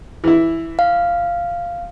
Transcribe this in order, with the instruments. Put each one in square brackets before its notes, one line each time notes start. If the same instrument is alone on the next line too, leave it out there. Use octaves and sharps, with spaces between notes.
[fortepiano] E3 E4
[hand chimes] F5